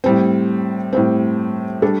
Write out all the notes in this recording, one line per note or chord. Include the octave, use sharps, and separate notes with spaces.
A2 G3 C4
A2 G3 C4
G3 D4 A4